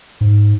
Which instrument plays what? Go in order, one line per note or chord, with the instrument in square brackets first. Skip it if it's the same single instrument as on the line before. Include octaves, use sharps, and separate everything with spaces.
[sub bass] G#2